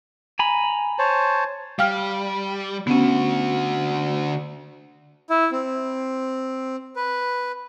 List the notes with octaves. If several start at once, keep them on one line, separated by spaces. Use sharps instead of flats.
G#5 A#5 B5
C5 C#5 A5
G3 F5 G5 F6
D3 B3 C#4 F#4
E4
C4
B4